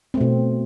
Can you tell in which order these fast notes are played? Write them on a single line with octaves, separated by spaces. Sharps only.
C4 A3 B2